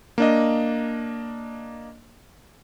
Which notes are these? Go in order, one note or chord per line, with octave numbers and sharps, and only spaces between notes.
A#3 D4 D#5